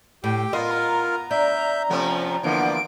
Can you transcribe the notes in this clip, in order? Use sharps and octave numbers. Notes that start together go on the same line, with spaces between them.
A2 G4 G5
B3 F4 A#4 D#5 C6
A#5
D4 E5 G6
C3 F3 A3 B3 C#4
D3 E3 F3 A#3 B3 D7